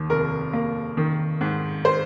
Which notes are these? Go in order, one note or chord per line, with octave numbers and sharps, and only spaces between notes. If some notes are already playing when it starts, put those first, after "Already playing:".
Already playing: D#2 D#3
F1 A#4
A#3
D#3
G#2
C5